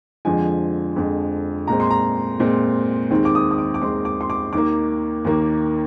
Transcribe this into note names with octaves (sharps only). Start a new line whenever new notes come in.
F2 D3 F3 G#3 G#5
F2 D3 F3 G#3
A#2 G#3 C4 A#5
C6
A#5
A#2 G#3 C4
D#2 D#3 G#3 C4
D6
D#6
D#6
D6
D6
D#2 D#3 G#3 C4 C6
D6
C6
D6
D#2 D#3 A#3 D6
D#2 D#3 A#3